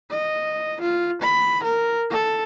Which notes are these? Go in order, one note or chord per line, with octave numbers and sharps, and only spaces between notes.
D#5
F4
B5
A#4
A4